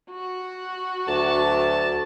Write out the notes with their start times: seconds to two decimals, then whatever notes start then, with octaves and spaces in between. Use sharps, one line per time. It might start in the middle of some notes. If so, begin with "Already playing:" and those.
0.11 F#4
1.08 D2 F#3 D5 A5